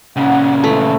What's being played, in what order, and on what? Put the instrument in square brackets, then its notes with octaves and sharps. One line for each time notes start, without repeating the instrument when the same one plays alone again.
[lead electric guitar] A#2 C#3 [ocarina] C#4 [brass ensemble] F#5
[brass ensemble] E3 F3 [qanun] A3